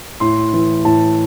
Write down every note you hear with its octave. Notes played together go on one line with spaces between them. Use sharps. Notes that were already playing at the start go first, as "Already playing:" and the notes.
A2 C6
E3
A2 A5